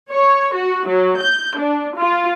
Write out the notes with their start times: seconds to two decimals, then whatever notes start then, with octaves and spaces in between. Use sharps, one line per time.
0.11 C#5
0.54 F#4
0.87 F#3
1.19 G6
1.58 D4
1.98 F4